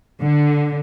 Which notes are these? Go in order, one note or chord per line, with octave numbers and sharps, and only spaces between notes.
D3